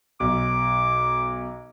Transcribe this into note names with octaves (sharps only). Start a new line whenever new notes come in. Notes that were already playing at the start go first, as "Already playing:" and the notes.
B1 D6